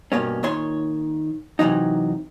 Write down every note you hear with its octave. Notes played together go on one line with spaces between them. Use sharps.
G2 B2 A#3 C#4
A#2 D#3 C#5 C6
C3 E3 F#3 D#4